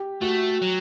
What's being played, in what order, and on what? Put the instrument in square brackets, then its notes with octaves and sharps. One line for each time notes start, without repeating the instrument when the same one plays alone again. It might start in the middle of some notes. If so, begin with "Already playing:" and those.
Already playing: [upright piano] G4
[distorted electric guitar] A3 [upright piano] F#4
[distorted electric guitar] F#3